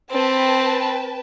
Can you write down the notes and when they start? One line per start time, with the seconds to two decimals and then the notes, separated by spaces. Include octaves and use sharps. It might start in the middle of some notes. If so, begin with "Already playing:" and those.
0.11 C4 B4 G5 A5